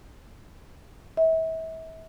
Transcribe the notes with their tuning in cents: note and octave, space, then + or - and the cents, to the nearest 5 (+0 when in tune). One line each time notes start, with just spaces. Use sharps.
E5 -35